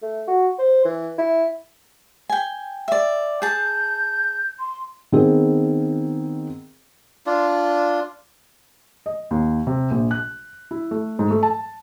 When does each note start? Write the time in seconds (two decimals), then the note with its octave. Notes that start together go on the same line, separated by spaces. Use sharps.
0.02 A3
0.27 F#4
0.59 C5
0.85 E3
1.18 E4
2.30 G5 G#5
2.88 D5 E5
3.42 G#4 A5 G6
4.59 C6
5.12 D#3 B3 C4 G#4 A#4
7.26 D4 F4
9.06 D#5
9.31 D#2
9.67 C3
9.91 A#1
10.11 F#6
10.71 E4
10.91 A3
11.19 G#2
11.31 A3
11.43 A5